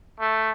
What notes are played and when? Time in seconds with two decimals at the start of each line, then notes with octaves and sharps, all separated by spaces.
0.20 A3